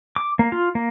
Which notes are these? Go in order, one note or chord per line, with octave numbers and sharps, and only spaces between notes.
D6
A#3
F4
A#3